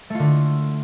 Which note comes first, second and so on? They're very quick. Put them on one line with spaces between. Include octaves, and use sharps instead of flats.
A3 F4 D3